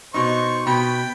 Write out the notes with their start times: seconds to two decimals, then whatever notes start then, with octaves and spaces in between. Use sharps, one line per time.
0.14 B2 D#4 C5 C#6
0.67 B2 G5 B5